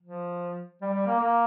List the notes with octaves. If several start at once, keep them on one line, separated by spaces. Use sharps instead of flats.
F3
G3
G3
A#3
A#3